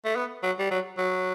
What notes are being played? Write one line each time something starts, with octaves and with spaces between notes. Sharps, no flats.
A3
B3
F#3
G3
F#3
F#3